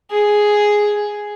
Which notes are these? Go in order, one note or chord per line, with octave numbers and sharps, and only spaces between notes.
G#4